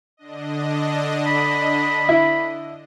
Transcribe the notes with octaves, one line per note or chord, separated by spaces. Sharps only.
D3 D4 D#5
B5
E4